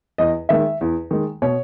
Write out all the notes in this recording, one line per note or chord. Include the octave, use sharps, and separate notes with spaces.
E2 D#5
D#3 G#3 E5
E2
D#3 G#3
B2 C#5